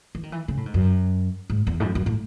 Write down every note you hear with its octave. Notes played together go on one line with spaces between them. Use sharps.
E3
D#3
E3
C#3
A2
G#2
F#2
G#2
E2
G#2
F#2
F#2
A2